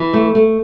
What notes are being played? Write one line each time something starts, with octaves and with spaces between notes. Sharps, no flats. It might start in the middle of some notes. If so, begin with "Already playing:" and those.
Already playing: E3
A3
A3